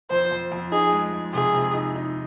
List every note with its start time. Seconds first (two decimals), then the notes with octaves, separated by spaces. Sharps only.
0.11 F2 C5
0.31 F2
0.52 F2
0.72 D#4 G#4
0.93 G#3
1.13 G#3
1.33 C3 G#4
1.54 C3
1.74 D#4
1.95 D#4